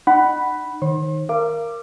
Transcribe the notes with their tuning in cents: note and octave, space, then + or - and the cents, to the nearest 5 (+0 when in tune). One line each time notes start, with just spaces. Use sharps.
D#4 -35 F#5 +20 B5 +0
D#3 +0 C5 +45 C6 +40
A#4 +0 F5 -35 D6 +10